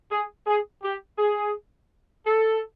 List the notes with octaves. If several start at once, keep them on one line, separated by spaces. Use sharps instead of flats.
G#4
G#4
G4
G#4
A4